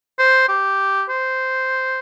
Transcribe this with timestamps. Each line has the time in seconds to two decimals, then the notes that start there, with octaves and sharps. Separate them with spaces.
0.19 C5
0.48 G4
1.09 C5